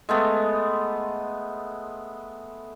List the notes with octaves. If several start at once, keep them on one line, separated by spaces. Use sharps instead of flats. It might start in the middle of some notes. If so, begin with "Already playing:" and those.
G#3 A3 B3